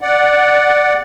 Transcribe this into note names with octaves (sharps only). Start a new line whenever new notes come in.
D5 F#5